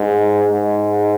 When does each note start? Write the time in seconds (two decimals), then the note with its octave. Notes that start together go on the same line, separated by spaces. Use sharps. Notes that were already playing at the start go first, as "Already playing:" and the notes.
Already playing: G#2
0.53 G#2